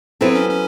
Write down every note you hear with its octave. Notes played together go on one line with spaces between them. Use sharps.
F#3 B3 C4 E4 A4 C5
C#4
C#4